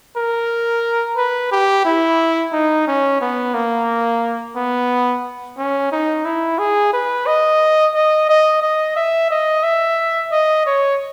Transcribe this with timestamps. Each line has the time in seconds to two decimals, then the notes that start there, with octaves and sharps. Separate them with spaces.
0.16 A#4
1.17 B4
1.52 G4
1.85 E4
2.53 D#4
2.87 C#4
3.21 B3
3.54 A#3
4.56 B3
5.58 C#4
5.92 D#4
6.25 E4
6.59 G#4
6.93 B4
7.26 D#5
7.94 D#5
8.29 D#5
8.62 D#5
8.96 E5
9.30 D#5
9.63 E5
10.32 D#5
10.66 C#5